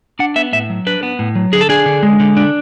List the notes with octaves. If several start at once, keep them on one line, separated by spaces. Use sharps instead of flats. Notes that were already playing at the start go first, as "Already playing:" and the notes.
D4 F#5
B3 E5
A2 E5
F#3
D4 B4
B3
A2
F#3
D3 G#4
A4
D4 G#4
D3
G#3
D3
D4